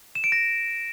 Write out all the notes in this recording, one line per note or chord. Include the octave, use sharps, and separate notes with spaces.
E7
D7
A#6